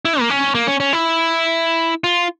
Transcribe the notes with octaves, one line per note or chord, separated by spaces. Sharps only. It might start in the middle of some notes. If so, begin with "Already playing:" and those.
E4
A#3
C#4
A#3
C#4
C#4
E4
F4